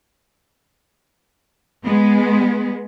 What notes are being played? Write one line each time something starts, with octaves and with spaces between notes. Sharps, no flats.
G#3 B3